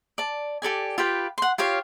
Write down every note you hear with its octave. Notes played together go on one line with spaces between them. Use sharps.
D5 A5
G4 A4 D5 G#5
F4 G4 B4 G5
F#5 C6
F4 G4 C#5 F5